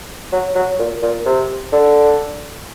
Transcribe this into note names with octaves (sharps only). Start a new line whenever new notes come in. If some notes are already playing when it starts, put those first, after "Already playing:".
F#3
F#3
A#2
A#2
C3
D3